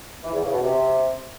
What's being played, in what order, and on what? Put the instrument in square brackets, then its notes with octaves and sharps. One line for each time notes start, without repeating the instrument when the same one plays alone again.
[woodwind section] E3
E2
C#3
B2
C3